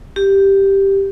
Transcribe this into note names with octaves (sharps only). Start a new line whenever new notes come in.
G4